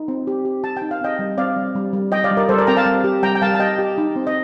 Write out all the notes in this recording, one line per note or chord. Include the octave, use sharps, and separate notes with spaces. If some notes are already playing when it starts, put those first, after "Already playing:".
Already playing: D#4
C4
G4
G4
G4 A5
G5
D#4
F5
C4 D#5 G5
G3
C4 D5 F5
G3
G3
G3
G3 D#5 G5
D5 F5
G3
A#4 D5
G3 A4 C5
A#4 D5
C4 G5 A#5
F5 A5
G3
G4
G3 G5 A#5
G5
G3 F5 A5
A5
G4 D#5 G5
G4
D#4
C4
D#5